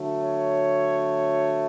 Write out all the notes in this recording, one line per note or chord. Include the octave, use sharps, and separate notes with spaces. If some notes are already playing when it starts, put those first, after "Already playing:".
Already playing: D3 F#3 A3
C#5